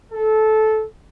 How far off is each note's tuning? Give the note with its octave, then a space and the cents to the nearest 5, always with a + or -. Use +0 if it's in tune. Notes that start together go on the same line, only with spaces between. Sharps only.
A4 -15